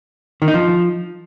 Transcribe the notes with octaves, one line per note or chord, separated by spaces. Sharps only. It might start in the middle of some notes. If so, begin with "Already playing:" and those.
D#3
D#4
F3